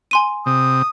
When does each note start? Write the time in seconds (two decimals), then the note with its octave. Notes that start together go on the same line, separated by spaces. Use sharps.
0.11 G#5 C6 D#7
0.46 C3 D#6